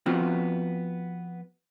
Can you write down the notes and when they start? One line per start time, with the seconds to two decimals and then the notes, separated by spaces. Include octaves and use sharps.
0.06 F3 B3 C4 F4 F#4